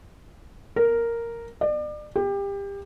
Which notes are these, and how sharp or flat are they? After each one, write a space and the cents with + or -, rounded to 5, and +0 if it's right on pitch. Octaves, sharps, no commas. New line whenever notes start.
A#4 -5
D5 +35
G4 +25